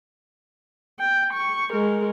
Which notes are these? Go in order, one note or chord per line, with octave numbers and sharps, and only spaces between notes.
G5
C#6
G#3 A#4